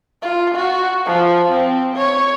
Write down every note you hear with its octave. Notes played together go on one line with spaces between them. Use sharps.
F4
F#4
F3
C4
C#5